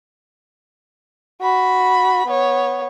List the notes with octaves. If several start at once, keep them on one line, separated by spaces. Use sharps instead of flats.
F#4 B5
B3 C#5